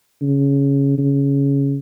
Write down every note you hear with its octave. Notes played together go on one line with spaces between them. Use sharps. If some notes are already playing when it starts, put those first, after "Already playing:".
C#3
C#3